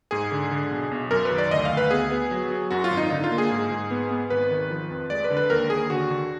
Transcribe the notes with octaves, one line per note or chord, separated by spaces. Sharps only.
G#2 G#4
D3
D3
B1
B1
F#2 A#4
B4
D#3
D5
D2 D#5
F5
D2
B4
B3 G#4
B3
F#3
F#3
F#2 F#4
F4
G#1
D#4
D3 D#4
F4
A#3
G#4
G#2
G#2
B3
B3
G#1 B4
D#3
F3
F2
G#3 D5
B4
D3
B4
D#2 A#4
D#2 G#4
D3 F#4
D3